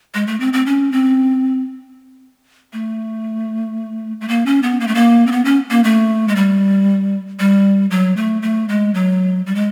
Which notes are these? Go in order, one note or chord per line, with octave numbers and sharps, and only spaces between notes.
G#3
A3
C4
C4
C#4
C4
A3
A3
A#3
C#4
B3
A#3
A3
A#3
C4
B3
C#4
A#3
A3
G#3
G3
G3
F#3
A3
A3
G#3
F#3
G3
G#3